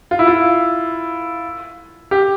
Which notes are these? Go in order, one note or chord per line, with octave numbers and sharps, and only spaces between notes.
F4
E4
F4
G4